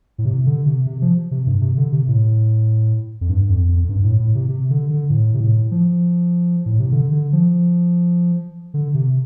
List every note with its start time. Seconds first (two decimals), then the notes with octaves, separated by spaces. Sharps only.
0.18 A2
0.25 C3
0.46 D3
0.66 C3
0.86 C3
1.02 F3
1.31 C3
1.46 G2
1.61 C3
1.77 D3
1.92 C3
2.08 A2
3.21 F2
3.29 G2
3.49 F2
3.69 F2
3.84 F2
3.89 G2
4.04 A2
4.20 A2
4.35 C3
4.49 C3
4.70 D3
4.90 D3
5.10 A2
5.34 C3
5.41 A2
5.71 F3
6.66 A2
6.79 C3
6.92 D3
7.12 D3
7.33 F3
8.74 D3
8.94 C3